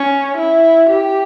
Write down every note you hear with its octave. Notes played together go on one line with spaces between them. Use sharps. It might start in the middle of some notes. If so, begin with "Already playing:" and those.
Already playing: C#4
E4
G4